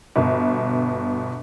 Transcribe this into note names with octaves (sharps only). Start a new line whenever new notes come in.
G1 B2